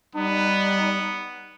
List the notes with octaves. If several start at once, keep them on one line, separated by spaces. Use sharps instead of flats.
G3 B3 D#4